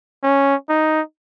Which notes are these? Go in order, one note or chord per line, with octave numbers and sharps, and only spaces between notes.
C#4
D#4